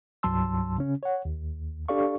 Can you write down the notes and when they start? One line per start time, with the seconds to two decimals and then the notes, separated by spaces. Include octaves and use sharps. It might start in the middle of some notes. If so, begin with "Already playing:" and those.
0.23 C2 G2 F#3 A5 C6 E6
0.78 C#3 C#4
1.03 C#5 F#5
1.25 D#2
1.88 D4 G4 A4 D5 F5 C#6